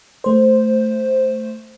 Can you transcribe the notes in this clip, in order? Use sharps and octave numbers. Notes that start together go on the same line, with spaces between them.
A3 C5